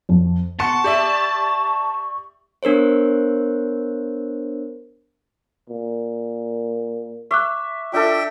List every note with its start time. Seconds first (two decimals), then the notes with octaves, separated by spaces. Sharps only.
0.09 F2
0.60 F#5 A5 C6 C#6 C#7
0.84 G4 D5 E5
2.63 B3 D4 A#4 C5 C#5
5.69 A#2
7.31 E5 C#6 D6 F#6
7.93 D4 F4 A4 E5 G5